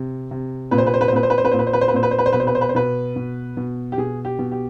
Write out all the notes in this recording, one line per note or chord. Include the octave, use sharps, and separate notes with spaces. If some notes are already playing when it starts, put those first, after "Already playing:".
Already playing: C3
C3
A#2 B4
C5
B4
C5
B4
C5
A#2 B4
C5
B4
C5
B4
A#2 C5
B4
C5
B4
C5
B4
A#2 C5
B4
C5
B4
C5
B2 B4
C5
B4
C5
B4
C5
B2 B4
B2
B2
G4
B2 G#4
G4
B2
G4